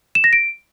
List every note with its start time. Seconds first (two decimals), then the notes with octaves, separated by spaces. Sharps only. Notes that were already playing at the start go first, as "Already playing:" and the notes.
0.15 E7
0.24 A#6
0.33 D7